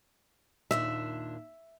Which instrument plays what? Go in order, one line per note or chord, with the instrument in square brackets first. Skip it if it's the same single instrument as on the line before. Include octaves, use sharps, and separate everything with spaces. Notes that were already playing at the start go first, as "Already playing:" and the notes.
[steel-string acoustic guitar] D#2 A#2 D4 [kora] E5